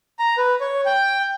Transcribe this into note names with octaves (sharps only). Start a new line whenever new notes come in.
A#5
B4
C#5
G5